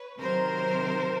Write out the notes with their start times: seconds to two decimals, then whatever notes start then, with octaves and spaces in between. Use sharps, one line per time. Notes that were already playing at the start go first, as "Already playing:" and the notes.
Already playing: B4 C#5
0.21 C3 D#3 F#3 A#4 C5